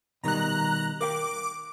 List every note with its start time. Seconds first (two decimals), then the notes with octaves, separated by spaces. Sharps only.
0.23 B2 D#3 G3 A#5 F#6
1.01 A#4 F5 G5 D6